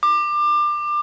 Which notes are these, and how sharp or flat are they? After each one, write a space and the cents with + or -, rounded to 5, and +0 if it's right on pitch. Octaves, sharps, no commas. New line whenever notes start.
D6 +25